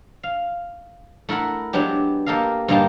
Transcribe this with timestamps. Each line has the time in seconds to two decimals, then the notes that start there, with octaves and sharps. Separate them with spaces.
0.23 F5
1.29 A3 E4 A#4 F#5 B5
1.73 F#3 G#3 B3 D4 G4
2.26 A#3 G4 A4 D#5 F5
2.68 G2 D3 A#3 D#4 G4 A5